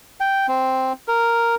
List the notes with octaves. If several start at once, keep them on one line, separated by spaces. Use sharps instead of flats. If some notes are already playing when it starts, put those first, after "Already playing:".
G5
C4
A#4